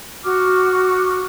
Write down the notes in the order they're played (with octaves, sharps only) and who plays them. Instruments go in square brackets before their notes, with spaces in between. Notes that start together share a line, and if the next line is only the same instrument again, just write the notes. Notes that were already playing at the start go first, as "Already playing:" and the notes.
[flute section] F#4 D6 F6